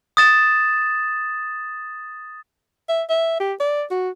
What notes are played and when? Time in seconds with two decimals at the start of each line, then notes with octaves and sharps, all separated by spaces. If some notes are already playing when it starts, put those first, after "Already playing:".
0.17 D#6 A6 E7
2.89 E5
3.10 E5
3.40 G4
3.60 D5
3.91 F#4